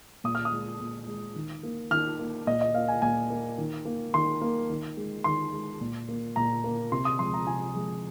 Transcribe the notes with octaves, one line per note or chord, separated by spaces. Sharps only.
A#2 D#6
F6
D#6
G#3
A#2
G#3
D#3
A#3
D#3 F6
A#3
A#2 D#5
D#5
A#3 F5
G#5
A#2 G#5
A#3
D#3
A#3
D#3 C6
A#3
D#3
G#3
D#3 C6
G#3
A#2
A#3
A#2 A#5
A#3
C3 C6
D#6
F3 G#3 C6
A#5
C3 G#5
F3 G#3